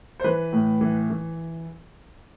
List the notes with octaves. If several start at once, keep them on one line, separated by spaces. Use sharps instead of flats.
C5
E3 B4
A2
E3
E3